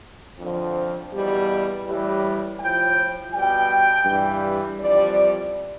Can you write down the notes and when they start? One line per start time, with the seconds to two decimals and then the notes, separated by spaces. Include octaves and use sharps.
0.37 F2 D3 F3
1.10 E2 B2 G3
1.84 A2 E3 G3
2.58 A2 F3 G5
3.31 B2 G3 G5
4.05 G2 E3 G3
4.79 F2 E3 G3 D5